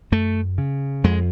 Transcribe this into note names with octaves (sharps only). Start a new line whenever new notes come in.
F#2 A3
C#3
F2 G#3